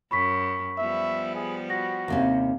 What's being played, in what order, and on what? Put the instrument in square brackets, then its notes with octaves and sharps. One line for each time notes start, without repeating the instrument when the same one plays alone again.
[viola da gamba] F#2 [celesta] B5 C#6 B6
[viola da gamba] F3 G3 B3 [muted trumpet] E5
[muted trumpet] G#4
[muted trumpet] F#4 [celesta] A#6
[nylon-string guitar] D#2 C3 C#4